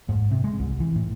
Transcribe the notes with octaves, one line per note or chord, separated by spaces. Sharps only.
G#2
C3
G#3
C2
E3
A2